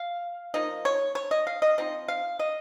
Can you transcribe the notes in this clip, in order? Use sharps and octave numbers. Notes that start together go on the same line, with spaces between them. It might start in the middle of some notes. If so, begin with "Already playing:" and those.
Already playing: F5
F3 A#3 D#4 D#5
C#5
C#5
D#5
F5
D#5
F3 C4 D#4 D#5
F5
D#5